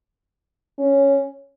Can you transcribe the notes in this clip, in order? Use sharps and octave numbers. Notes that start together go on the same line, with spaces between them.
C#4